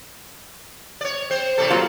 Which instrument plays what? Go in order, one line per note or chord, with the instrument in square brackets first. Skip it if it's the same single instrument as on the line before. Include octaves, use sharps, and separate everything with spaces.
[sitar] C#5 D5
C4 C5
A2 C3 A4
[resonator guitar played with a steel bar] F#3 A#3 F4